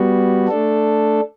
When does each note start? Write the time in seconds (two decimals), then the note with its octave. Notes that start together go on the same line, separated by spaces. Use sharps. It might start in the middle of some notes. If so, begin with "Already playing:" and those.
Already playing: G3 B3 F#4
0.48 A3 D4 A4